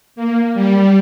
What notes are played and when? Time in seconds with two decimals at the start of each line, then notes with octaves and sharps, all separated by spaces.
0.16 A#3
0.54 G3